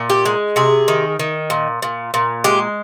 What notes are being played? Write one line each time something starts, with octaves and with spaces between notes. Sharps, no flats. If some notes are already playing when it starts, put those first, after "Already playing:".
Already playing: A#2
G4
G#3
C3 G#4
D#3
D#3
A#2
A#2
A#2
G#3 G4